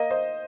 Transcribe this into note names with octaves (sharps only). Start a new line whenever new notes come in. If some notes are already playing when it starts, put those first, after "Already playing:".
Already playing: A#3 D#5
C5 D#5